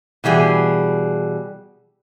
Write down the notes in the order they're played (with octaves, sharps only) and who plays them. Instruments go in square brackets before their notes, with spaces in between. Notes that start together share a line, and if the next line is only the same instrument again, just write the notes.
[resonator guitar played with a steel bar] B2 E3 G3 G#4